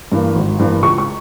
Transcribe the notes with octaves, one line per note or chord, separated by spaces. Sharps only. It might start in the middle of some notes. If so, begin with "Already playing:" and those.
G2 E3 A#3
G#1
G2 E3 A#3
C#2 C#6
C#6